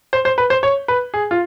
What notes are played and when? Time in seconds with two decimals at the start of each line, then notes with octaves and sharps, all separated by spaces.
0.13 C5
0.25 C5
0.38 B4
0.50 C5
0.63 C#5
0.88 B4
1.14 G#4
1.31 F4